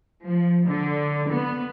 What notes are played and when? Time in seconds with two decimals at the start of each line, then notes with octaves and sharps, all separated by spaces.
0.24 F3
0.65 D3
1.29 B3